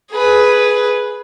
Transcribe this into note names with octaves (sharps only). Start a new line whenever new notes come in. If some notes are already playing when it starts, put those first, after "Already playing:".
G#4 B4